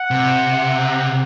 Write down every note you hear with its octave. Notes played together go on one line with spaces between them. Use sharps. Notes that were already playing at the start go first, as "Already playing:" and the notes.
Already playing: F#5
C3